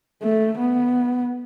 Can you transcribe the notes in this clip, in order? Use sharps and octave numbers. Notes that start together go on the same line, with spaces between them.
A3
B3